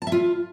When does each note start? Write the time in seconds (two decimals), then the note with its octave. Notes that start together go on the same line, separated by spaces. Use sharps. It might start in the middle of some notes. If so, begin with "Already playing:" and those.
0.02 A5
0.07 E5
0.12 F4